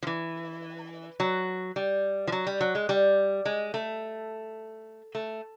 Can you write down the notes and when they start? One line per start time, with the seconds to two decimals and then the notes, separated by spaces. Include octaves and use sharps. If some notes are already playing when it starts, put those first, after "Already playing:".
0.03 F3
0.07 E3
1.20 F#3
1.76 G3
2.27 F3
2.32 F#3
2.47 G3
2.61 F#3
2.75 G#3
2.89 G3
3.45 G#3
3.74 A3
5.15 A3